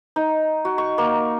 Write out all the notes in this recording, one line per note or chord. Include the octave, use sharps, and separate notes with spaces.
D#4
F#4
C#6
A#3